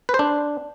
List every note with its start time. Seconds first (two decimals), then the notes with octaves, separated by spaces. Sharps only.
0.09 B4
0.14 C5
0.19 D4